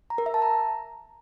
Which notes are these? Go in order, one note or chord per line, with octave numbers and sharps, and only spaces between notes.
A#5
A#4
E5
A5
A#5